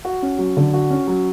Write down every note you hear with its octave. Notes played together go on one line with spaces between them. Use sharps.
F#4
C#4
F#3
D3
F#4
C#4
F#3